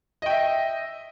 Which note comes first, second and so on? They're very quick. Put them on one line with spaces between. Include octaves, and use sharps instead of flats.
D#5 G5 E5